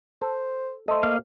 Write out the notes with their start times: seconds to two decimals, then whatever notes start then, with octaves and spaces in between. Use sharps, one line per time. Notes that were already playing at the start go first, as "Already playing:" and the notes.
0.22 A4 C5
0.88 A3 A4 C5 D#5
1.03 A#3 F5